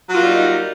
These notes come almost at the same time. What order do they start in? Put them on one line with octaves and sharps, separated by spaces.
F#3 F4 A#3 G3 D#4